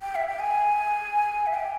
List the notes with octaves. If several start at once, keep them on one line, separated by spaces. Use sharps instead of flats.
G5
E5
G5
G#5
E5
G5